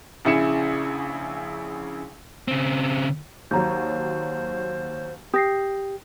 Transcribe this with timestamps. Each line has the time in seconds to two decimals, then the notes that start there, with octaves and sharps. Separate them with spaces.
0.25 A#1 C#3 E4 G#4 C#7 E7
2.48 C#3 C4
3.51 D#2 F#3 C5 A#5 G6
5.34 G4 D#6 A#6 C7